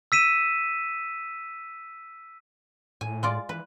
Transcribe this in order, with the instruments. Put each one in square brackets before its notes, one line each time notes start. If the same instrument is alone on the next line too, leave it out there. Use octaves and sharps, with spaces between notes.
[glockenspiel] E6 B6 D#7 E7
[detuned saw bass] A2 [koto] G#5
[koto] G#3 F4 D5
[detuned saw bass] E3 [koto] B4